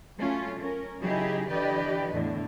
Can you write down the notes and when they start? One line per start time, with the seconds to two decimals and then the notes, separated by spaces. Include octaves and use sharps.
0.19 F#3 A3 C#4 F4
0.59 C#4 A#4
1.01 C#3 F#3 D#4 E4 G4 G#4
1.49 D3 E3 G4 B4 D5 D#5
2.13 E2 A2 D3